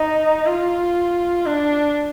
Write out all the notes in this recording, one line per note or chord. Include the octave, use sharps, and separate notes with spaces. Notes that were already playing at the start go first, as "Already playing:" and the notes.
Already playing: D#4
F4
D4